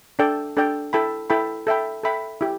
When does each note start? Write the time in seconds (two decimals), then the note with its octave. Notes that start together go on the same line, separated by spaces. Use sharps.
0.19 D4 A4 D5 G5
0.57 D4 A4 D5 G5
0.93 E4 A4 G5 B5
1.30 E4 A4 G5 B5
1.67 A4 E5 G5 B5
2.03 A4 E5 G5 B5
2.41 E4 G4